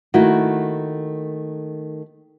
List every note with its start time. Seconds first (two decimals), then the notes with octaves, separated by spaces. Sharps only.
0.14 D#3 A3 A#3 E4 F#4